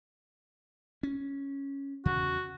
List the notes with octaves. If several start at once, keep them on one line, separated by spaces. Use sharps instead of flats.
C#4
E2 C#3 F#4